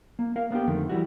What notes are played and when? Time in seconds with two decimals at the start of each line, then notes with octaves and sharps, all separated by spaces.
0.19 A#3
0.36 A#3 A#4 F5
0.51 A#3 B3 D4 G4
0.67 F2 D3 D#3 A3
0.89 E3 G3 F#4